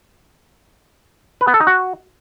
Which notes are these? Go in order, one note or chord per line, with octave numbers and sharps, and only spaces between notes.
B4
B3
A4
D#4
F#4